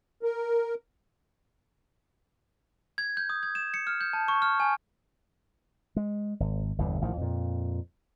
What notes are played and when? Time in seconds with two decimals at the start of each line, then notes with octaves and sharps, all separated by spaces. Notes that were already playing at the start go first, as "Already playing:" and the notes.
0.23 A#4
2.98 G#6
3.17 G6
3.30 D#6
3.43 G#6
3.55 E7
3.74 C#7
3.87 F6
4.01 G6
4.13 A5
4.28 C#6
4.42 F6
4.60 G#5
5.96 G#3
6.40 G#1
6.78 G1 E2 G2 C3
7.01 A1 A2 D#3 F3
7.17 F2 A#2